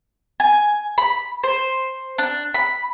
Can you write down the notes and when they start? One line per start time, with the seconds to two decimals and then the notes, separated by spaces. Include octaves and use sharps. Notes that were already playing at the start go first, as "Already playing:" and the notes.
0.40 G#5
0.98 B5
1.44 C5
2.18 D4
2.54 B5